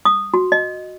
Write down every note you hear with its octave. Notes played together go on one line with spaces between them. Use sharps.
D#6
F#4
D#5